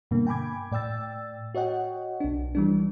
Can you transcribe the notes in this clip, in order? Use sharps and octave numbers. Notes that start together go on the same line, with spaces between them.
G2 B2 D3 A#3
G5 G#5 B5 D6 G#6
A2 D5 G5 E6 A6
F#4 C#5 D#5 F#5 G5
B1 D4
E3 G3 D4